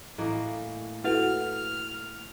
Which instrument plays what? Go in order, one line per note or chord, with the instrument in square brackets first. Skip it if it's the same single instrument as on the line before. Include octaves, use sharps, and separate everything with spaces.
[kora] A2 E3 A#3 [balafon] D#5
[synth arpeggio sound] E4 F#4 [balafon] A4 B4 F#5 [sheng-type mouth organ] F6